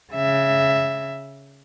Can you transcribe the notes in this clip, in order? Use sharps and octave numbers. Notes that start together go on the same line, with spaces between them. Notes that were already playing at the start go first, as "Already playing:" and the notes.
C#3 E5